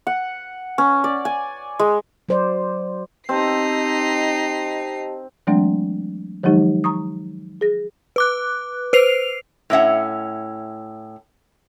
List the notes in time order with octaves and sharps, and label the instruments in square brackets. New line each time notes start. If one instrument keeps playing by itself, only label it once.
[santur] F#5
C#4
D5
G#5
G#3
[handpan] F#3 C5 D5
[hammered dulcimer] C4 [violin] D#4 C7 [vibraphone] G4 D#5 A5
[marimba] E3 F#3 G#3 A3 C4 D4
D#3 F3 F#3 G#3 D#4 G4
A#5 C#6 D#6
G#4 A#6
[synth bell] B4 D6 F#6
B4 C5 C7 F7
[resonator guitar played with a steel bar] A2 C#4 E5 F#5